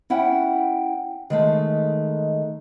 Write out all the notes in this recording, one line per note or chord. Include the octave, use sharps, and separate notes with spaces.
C#4 E4 F#5 G5
D#3 G#3 A3